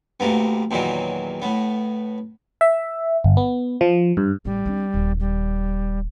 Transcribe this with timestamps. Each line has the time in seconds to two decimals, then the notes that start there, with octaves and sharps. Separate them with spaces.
0.20 D2 C3 A#3 B3
0.71 E2 A#2 D#3 E3 F#3
1.42 A2 B3
2.61 E5
3.24 G1
3.37 B3
3.81 F3
4.17 G2
4.45 A1 G3
4.66 C4 D4
4.94 D#1
5.20 G3